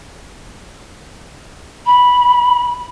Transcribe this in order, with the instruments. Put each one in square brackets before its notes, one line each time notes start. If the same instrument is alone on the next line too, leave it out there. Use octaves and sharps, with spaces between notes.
[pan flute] B5